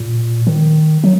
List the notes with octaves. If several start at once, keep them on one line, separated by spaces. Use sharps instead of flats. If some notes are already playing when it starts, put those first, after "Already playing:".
Already playing: A#2
D#3
F#3